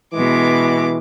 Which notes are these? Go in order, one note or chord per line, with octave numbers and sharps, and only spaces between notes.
B2 E3 G#3 D6